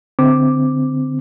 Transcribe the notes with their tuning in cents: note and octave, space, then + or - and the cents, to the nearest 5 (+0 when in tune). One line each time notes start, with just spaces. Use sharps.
D3 +0 C4 -20 D6 +0